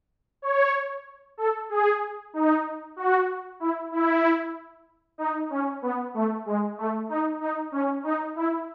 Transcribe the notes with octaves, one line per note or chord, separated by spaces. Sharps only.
C#5
A4
G#4
D#4
F#4
E4
E4
D#4
C#4
B3
A3
G#3
A3
D#4
D#4
C#4
D#4
E4